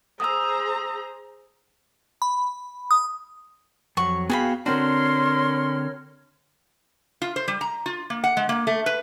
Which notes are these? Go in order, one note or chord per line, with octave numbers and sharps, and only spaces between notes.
G#4 C5 A#5 D#6 E6
B5
D#6
F2 F#3 F#5 C#6
B3 F#4 G#4 F5 G5 B5
D3 C4 D4 F#4 A#4 C#5 C6 F6
F4
C5
G3
A#5
F4
A#3
F#5
G#3
A#3
A3
B4